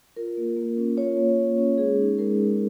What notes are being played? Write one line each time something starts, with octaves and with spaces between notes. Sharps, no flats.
F4 A#4
A#3
A#3
C#4
F4 C#5
A#3
A#3
C#4
G#3 G#4
D#4
G#3 A#4
D#4